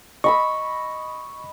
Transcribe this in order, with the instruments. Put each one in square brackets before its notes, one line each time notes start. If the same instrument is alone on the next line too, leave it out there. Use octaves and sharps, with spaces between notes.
[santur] D#5 B5 E6 [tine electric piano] C#6